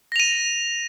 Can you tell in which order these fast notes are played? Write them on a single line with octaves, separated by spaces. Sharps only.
A#6 F7 D#7